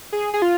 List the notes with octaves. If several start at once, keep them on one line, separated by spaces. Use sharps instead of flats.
G#4
G#4
F4